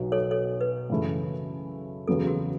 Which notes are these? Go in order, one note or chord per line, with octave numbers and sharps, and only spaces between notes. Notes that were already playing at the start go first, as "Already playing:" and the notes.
Already playing: B1 B2 F#3
A4 C#5
A4 C#5
B4
F#2 C#3 E3 A3 E4
E2 C#3 F#3 B3 A4
F#4